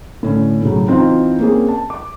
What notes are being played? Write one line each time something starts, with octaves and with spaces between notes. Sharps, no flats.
A2 D3 C#4
A2 C#3 F#3
E3 C4 D#4 F4
A#3 C4 C#4 G#4
A5
D6